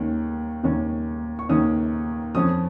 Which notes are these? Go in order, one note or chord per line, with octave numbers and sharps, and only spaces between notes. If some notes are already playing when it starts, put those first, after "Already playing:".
Already playing: D#2 D#3 C#4
D#2 D#3 C#4
C#6
D#2 D#3 C#4 D#6
F2 F3 C#4 D#6